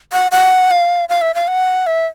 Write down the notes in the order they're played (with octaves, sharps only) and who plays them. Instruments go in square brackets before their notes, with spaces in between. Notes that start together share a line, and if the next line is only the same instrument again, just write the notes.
[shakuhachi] F#5
F#5
F5
F5
E5
F5
F#5
E5